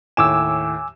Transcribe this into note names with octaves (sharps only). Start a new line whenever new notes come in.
D#2 A2 G#5 D6 E6 E7